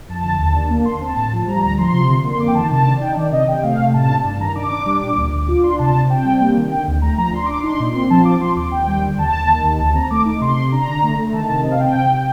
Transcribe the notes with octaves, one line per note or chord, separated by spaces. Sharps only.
F2 A5
D3
D#2
D4
A#3
D3 C6
C4 A5
A2
F3
G3 A#5
D2 A#5
F3 C6
C3
D3
A#3
C6
F2 D6
G5
D#3 A5
C3 A5
D4
D#4 G5
D#3 D5
C3 D#5
C3 G5
A3 F5
C3
A2 A5
D4
G2 A5
D#3 A#5
D4 D6
D4
G3
A#2
D2
D2
F4 D6
D4 C6
C3 A5
C3
C4 G5
G3
A#3
D#3
D3 G5
D2
A3 A#5
F3 A#5
D4 C6
D4 D6
D#4 C6
A#2
C4 C6
F3 A5
C4 D6
F3 C6
D#2 D6
D#2 G5
G3
D3
D#2 A5
D#2
D#3
D#2
D2 A5
C4 A#5
A3 D6
D#4 D6
C3 C6
C3
D4 A#5
D3
A3
A3
D#3 A5
C3 A5
C4 D#5
F5
C4 G5
C3
C3